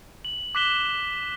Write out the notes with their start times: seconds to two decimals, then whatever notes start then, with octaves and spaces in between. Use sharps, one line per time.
0.25 F#7
0.55 D6 F#6 B6 E7 G7